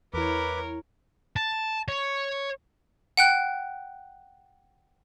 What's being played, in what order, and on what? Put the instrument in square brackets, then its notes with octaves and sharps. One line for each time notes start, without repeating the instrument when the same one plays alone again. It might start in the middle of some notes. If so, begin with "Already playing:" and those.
[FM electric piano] E2 E4 [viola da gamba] A#4 C#5 [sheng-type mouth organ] B4 B5 D6
[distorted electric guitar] A5
C#5
[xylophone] F#5 G5 F#6